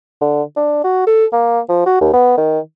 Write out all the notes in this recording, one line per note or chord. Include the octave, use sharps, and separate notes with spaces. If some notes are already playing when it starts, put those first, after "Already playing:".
D3
D4
F#4
A4
A#3
F3
F#4
D#2
B3
D#3